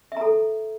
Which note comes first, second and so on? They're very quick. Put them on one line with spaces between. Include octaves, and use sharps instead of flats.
E5 A#5 A4